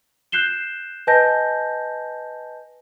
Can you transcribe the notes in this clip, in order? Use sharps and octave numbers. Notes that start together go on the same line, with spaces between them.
F#6 G6 C7 E7 G7
B4 D#5 G#5 A5 G6 A#6